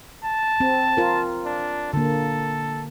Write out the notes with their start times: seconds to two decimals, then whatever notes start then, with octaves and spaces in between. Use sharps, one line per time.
0.24 A5
0.60 C4
0.97 F4 A#4
1.46 D4
1.93 D3 A#3 A4